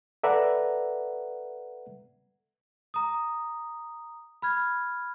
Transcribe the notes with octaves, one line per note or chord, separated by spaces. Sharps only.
A4 B4 D5 E5 F#5 A#5
A#5 D#6
B5 F6 G#6